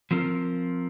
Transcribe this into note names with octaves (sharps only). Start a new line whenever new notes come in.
F3 C4 F4 A#4